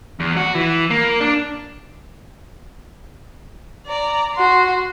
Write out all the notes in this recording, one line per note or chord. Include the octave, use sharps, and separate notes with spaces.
E2
F#4
E3
A#3
D4
D5 A#5
F#4 C6